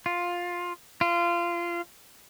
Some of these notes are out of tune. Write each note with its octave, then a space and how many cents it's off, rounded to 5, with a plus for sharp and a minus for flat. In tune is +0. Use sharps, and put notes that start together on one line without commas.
F4 +10
F4 -20